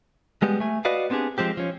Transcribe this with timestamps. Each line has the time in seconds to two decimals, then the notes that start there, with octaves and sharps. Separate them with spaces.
0.42 G3 G#3 B3 G4
0.60 A3 G#5
0.85 F#4 B4 D5 D#5 F5
1.10 B3 C4 D4 G4 G#4
1.38 F3 G#3 C4 G4
1.57 F3 C#4